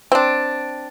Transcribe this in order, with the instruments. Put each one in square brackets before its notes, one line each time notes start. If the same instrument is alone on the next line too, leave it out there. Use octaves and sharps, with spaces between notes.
[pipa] C4 D4